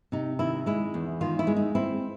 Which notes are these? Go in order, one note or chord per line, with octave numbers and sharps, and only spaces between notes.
C3 D#4
D#3 E4
G#3 E4
E2
D#3 F4
E4
G#3
D#4
C4 E4